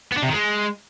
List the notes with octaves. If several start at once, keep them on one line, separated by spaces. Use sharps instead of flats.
B3
D4
C3
D#3
G#3